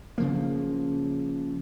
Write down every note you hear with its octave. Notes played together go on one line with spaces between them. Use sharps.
C#3 F3 A#3